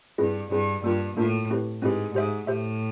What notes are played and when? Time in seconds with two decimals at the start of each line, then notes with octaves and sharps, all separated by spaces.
0.18 G2 C4 E4 G#4 B4
0.51 G2 C4 E4 G#4 B4
0.84 G2 A#3 D4 F4 A#4
1.17 A2 A#3 D4 F4 A#4
1.50 C4 E4 G4 B4
1.82 G#2 C4 E4 G4 B4
2.15 G#2 G4 C5 E5
2.47 A2 G4 C5 E5